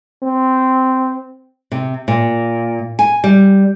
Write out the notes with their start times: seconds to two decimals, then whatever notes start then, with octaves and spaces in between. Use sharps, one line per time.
0.23 C4
1.72 C3
2.08 A#2
2.99 G#5
3.24 G3